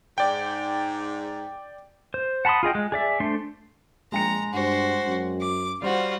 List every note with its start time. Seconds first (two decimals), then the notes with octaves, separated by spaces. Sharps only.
0.18 G#2 D5 G5
2.14 C5
2.45 F#5 A5 B5 C6 D#6
2.63 F4 G#4 D#5 G5
2.75 G#3
2.92 G#4 D5 E5
3.20 A3 D4 C5 C6
4.12 A#1 G#3 G5 A#5 C#7
4.53 G2 F#4 C5
5.07 F#2
5.42 D6
5.82 G3 F4 F#4 C5